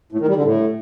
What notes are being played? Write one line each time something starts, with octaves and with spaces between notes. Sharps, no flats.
A2
D#3
G3
D3
A2